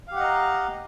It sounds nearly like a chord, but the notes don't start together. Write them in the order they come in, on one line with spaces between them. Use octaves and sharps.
F5 G4 F#5 D#5 A#5